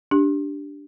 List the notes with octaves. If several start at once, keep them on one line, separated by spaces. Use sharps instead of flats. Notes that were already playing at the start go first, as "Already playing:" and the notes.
D4 G4